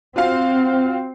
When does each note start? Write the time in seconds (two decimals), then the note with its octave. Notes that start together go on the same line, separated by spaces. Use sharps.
0.16 C4 F4 F#4 F5